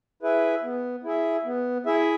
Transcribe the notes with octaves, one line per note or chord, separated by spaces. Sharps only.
E4 G#4 B4 E5
B3
E4 G#4 E5
B3
E4 G#4 E5